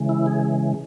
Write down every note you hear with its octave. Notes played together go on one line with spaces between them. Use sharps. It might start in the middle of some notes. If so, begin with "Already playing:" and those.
Already playing: C#3 E3 G#3
E4
G#4